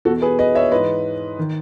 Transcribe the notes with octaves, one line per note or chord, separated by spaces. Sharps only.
E2 B2 F#4 A4
G#4 B4
B4 D#5
C#5 E5
G#2 E3 B4 D#5
D#3